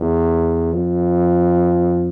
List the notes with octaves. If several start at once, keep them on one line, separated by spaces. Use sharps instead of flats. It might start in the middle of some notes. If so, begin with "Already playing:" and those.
Already playing: E2
F2